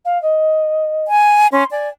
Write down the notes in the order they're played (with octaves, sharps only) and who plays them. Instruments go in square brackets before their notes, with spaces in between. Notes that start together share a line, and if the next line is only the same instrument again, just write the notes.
[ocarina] F5
D#5
[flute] G#5
[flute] C#4 [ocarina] C6
[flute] D5 [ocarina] G#5